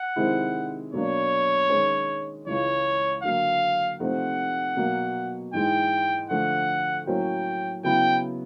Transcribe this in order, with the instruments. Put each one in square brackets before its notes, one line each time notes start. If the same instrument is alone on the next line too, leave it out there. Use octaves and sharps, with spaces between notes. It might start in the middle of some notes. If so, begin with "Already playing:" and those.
Already playing: [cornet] F#5
[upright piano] C3 D#3 G#3 C4 E4
[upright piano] B2 F#3 A#3 D4 [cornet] C#5
[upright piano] D#3 G#3 C#4
[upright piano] C#2 C#3 E3 [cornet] C#5
[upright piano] D3 F#3 A#3 [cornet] F5
[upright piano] C3 F3 A3 C4 D#4 [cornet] F#5
[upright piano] B2 F#3 A#3
[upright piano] G#2 E3 G#3 [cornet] G5
[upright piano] D3 F3 A3 [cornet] F#5
[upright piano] A2 F#3 A#3 C#4 [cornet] G5
[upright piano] C#3 F#3 B3 E4 [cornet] G5